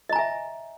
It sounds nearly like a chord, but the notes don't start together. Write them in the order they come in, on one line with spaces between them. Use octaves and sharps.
D#5 A#5 G#5 E5